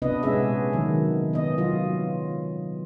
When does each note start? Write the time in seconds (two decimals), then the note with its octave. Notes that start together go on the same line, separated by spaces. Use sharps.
0.02 C3 B3 D4 B4 D#5
0.23 A#2 G#3 B3 C#4 G#4 E5
0.73 D#3 F#3
1.33 B3 D#5
1.58 F#3 F4